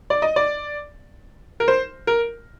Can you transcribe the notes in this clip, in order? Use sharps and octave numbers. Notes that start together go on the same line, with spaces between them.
D5
D#5
D5
A#4
C5
A#4